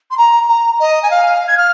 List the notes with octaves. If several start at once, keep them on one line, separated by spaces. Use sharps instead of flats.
C6
A#5
A#5
D#5
G#5
F5
G#6
F6